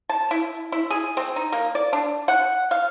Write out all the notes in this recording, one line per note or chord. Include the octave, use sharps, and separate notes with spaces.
A5
E4
E4
G#4
C4
D#4
A#3
D5
D4
F#5
F5